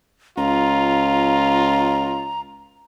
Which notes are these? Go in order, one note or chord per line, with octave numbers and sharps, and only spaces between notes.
C#2 F4 A#5